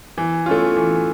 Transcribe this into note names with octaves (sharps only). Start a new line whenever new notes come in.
E3
A3 C#4 F4
E3